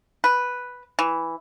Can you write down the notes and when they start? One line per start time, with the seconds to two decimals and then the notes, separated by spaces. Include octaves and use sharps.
0.24 B4
0.99 E3